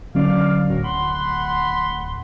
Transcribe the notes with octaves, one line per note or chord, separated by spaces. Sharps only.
D3 F#3 C#4 D5 F5
D1 A2 F#4 A#4
F#5 B5 C6